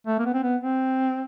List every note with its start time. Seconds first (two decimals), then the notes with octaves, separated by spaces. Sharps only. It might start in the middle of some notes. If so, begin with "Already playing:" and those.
0.07 A3
0.19 A#3
0.26 B3
0.34 C4
0.43 B3
0.61 C4